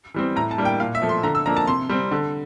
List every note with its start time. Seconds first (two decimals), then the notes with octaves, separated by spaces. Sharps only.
0.14 E3 G3 C4
0.36 A2 A#5
0.51 A5
0.58 G3 A#3 D4
0.65 G5
0.80 A#2 F5
0.95 E5
1.02 F3 A3
1.09 C6
1.23 D3 A#5
1.35 E6
1.46 F3 A#3 D4 A#5
1.57 A5
1.68 C3 C6
1.89 G3 C4
2.11 D3